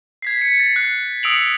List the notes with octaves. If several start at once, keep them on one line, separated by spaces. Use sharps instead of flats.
G#6 B6 C7
B6 C#7
A6
F#6
D#6 E6 C#7 D7 F7 F#7